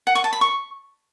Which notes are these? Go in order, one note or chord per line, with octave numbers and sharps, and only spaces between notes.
F#5
C#6
A5
B5
C#6